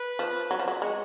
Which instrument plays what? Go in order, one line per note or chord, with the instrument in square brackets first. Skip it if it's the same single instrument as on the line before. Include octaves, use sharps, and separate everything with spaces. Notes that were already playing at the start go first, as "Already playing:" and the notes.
Already playing: [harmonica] B4
[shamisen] F3
F#3
F3
F#3
[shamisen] G#3 [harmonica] F#4